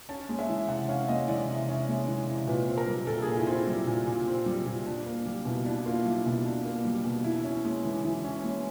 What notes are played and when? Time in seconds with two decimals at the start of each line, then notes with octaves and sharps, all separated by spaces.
0.09 C#4 A5
0.29 G#3
0.39 E5
0.49 E3
0.68 C3 F#5
0.89 C#4 F5
1.08 G#3 D#5
1.28 E3 D5
1.48 C3
1.68 C#4
1.88 G#3
2.08 E3
2.28 C3
2.47 A#2 B4
2.68 C4
2.78 A#4
2.88 G3
3.07 A#2 A4
3.22 G#4
3.27 A#2
3.37 E4
3.47 C4
3.52 E4
3.67 G3
3.87 A#2
4.07 A#2
4.27 C4
4.46 G3
4.66 A#2
4.87 D4
5.06 A#3
5.26 G3
5.45 B2 E4
5.65 D4 E4
5.86 A#3 F4
6.05 G3 E4
6.26 B2
6.45 D4
6.66 A#3
6.85 G3
7.04 B2
7.24 E3 E4
7.44 C#4
7.65 G#3
7.85 E3
8.05 E3
8.24 C#4
8.44 G#3